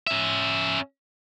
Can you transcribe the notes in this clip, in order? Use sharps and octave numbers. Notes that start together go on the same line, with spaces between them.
C#4 E5